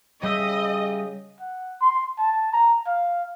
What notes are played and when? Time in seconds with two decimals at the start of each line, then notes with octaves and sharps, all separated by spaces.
0.23 C#3 G3 G4 D#5 E5
1.40 F#5
1.81 C6
2.18 A5
2.53 A#5
2.86 F5